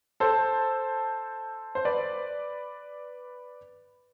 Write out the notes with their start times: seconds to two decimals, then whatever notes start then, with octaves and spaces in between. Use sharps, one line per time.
0.20 A4 C5
1.75 C5
1.85 B4 D5